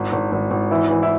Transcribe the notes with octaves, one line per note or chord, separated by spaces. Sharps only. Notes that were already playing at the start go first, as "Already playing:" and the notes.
Already playing: G#1
G#1
G#1
G#1
E3 E4
E3
E4